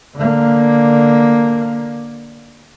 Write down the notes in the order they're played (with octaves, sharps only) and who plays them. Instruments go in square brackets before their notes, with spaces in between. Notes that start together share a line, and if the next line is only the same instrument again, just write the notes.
[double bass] D3 A#3